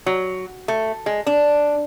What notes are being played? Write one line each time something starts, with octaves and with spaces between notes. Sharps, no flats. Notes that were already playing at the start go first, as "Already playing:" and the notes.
F#3
A3
G#3
D4